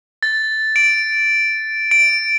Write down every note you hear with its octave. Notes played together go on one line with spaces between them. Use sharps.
A6
D7
D7